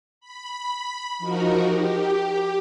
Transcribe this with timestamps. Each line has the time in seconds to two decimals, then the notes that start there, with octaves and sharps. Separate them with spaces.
0.20 B5
1.19 F3 D#4 F#4 A#4
1.65 G4